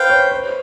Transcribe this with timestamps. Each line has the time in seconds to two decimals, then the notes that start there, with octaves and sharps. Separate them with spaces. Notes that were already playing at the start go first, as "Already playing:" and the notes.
Already playing: B4 C5 F5 G5
0.09 C#5
0.31 C5